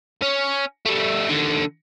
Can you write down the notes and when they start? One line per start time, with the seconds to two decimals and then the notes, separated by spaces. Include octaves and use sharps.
0.22 C#4
0.86 G3 A3
1.29 D#2 D3